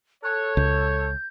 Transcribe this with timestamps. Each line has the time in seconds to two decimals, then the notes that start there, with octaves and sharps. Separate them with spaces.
0.24 A4 C#5 F#6
0.57 C#2 G6